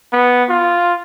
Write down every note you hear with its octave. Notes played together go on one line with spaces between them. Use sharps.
B3
F4